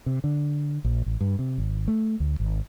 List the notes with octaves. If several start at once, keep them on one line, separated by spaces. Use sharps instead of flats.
C3
D3
A#1
A1
G2
C3
G#1
A3
D2
G#1